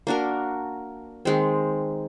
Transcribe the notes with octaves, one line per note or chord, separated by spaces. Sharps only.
A#3 D4 F#4 A#4
D#3 G#3 C4